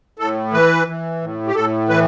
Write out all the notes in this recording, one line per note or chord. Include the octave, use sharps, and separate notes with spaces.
A2 A4
E3 B4
E3
A2
G4
A2 A4
E3 B4